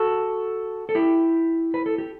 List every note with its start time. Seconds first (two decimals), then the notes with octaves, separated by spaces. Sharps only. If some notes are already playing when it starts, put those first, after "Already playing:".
Already playing: F#4 A4
0.89 A4
0.95 E4 G4
1.74 B4
1.86 A4
1.98 G4